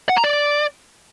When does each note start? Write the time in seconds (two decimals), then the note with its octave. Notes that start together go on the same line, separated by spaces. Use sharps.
0.09 F#5
0.17 A#5
0.24 D5